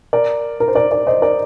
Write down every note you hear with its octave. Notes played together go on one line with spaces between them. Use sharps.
A#4 D5
A#4
C5
A#4 D5
A#4 D5
C5 D#5
A#4 D5